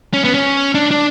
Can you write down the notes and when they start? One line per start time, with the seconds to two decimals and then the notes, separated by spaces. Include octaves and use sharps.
0.14 C#4
0.24 B3
0.34 C#4
0.75 D4
0.91 D4